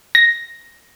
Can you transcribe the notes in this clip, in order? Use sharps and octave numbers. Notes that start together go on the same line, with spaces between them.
A#6